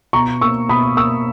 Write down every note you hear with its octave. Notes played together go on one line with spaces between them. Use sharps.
B2 A#5 C#6
A#3 C#6 E6
B2 B5 D#6
A#3 C#6 E6